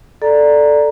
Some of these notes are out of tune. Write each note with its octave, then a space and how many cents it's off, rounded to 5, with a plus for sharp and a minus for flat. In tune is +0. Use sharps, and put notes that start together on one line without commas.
A4 +0 D5 +5 A#5 +0